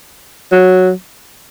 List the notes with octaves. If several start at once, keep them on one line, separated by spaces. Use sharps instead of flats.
F#3